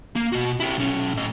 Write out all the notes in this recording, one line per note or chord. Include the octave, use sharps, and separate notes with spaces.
A#3
B2 F#4
E4 G4
B1 C#4
A2 D#5